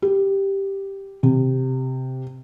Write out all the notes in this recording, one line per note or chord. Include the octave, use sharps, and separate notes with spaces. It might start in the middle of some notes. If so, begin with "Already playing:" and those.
G4
C3